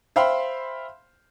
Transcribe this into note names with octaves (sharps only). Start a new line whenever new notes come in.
C5 E5 F5 G5 B5 C6